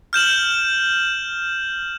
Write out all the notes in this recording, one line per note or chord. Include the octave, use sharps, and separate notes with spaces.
F6 G6 E7 F#7